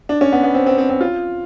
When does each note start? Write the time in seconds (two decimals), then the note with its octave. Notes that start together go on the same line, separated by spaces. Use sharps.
0.09 D4
0.21 C#4
0.32 B3
0.43 B3
0.54 C4
0.66 C4
0.78 C4
0.90 C4
1.01 F4